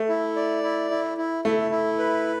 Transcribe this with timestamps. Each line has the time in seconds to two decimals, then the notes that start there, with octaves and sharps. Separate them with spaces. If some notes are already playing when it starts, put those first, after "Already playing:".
Already playing: A3
0.09 E4
0.36 D5
0.63 E4
0.91 E4
1.18 E4
1.45 A3 E4
1.71 E4
1.99 B4